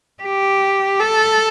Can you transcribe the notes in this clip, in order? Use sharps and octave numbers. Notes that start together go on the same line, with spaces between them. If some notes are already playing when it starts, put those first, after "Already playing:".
G4
A4